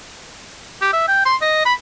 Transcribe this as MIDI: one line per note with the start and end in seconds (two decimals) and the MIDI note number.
0.81 0.90 67
0.93 1.05 76
1.08 1.22 79
1.25 1.36 84
1.41 1.63 75
1.65 1.74 83